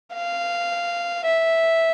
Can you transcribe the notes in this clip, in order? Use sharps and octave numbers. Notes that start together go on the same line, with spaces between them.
F5
E5